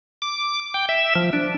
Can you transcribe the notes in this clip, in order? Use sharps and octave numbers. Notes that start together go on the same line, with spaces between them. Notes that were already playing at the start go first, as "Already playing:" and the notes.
D6
G5
E5
F3
D4